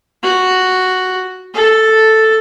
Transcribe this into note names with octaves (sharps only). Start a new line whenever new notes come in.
F#4
A4